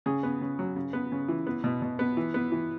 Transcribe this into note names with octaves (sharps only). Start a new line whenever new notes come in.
C#3 G#4
B3
C#3
F#3
C#3
B3
C#3
E3
B3
B2
B2
B3
E3
B3
E3